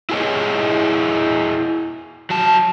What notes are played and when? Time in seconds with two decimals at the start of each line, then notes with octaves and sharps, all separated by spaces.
0.10 E4 F4 G#4 A#4 C#5 D#5
2.30 F#3 A5